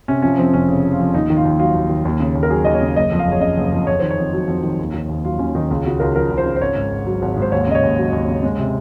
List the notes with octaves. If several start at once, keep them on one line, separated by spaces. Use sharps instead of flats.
C3 C#4
F3 C#4
F2 C4
F1 C#4
C#3
F3
F4
F2
D#2 D#4
D#3
F4
D#2
F#3 F4
D#2
D#3
D#2
C#3
D#2
A#4
F#3 G#4
D#2 D#5
C#5
C#3
F#1 D#5
F2
F5
F#1 C#5
C#3 D#5
F#1
F2
F2 C#5
D#3 C5
C#5
F2
F#3
F2
D#3
D#2
D#3
D#2
F#3 F4
D#2 C#4
D#3 D#4
C#2 F4
C#3 F#4
C#2 A#4
F3 A#4
C#2
C5
C#3
C5
G#1 C#5
G#2
G#1
F#3
G#1
G#2
C5
D#2 C#5
C#3 D#5
C#5
D#2
F#3
D#2
C#3
G#3
C3